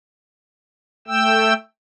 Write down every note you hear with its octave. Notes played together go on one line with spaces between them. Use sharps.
A3 G5 E6